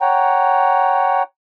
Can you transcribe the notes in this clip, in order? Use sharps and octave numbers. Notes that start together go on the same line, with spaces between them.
C#5 F#5 G5 A#5